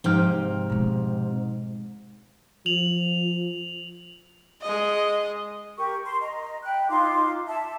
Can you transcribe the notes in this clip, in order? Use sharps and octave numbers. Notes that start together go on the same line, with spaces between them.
G#2 C3 F3 G5 F6
B2 G#3
F3 F7 F#7
G#3 D#5
G4 A#4 C#6
C6
D#5 A#5
G5 B5 F#6
D#4 F4 C6 D6
E5 A5